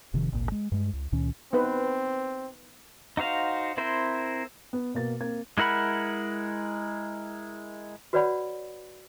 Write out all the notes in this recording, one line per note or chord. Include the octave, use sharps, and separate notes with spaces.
F1 C3 D#3 F3
G#1 C#2 A#2
G#3
G2 G#3
C#2
C#2 A#2 D#3 C#4
B3 C4 D#4 B4
D#4 F#4 C5 F5
C4 E4 A#4 C5
B3
B2 A#3 A6
A#3 C4 G#6
G#3 E4 A#4 F#5 B5
F#4 B4 C#5 D5 F#5 B5